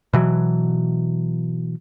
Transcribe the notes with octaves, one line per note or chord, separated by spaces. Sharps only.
B2 E3 F#3